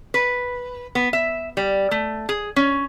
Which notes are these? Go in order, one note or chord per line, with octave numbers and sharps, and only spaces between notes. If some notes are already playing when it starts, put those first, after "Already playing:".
B4
B3
E5
G3
A3
G#4
C#4